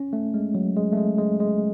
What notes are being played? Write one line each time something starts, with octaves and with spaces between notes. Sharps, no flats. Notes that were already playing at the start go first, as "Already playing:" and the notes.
Already playing: C#4
A3
G#3
F#3
G#3
A3
G#3
G#3
G#3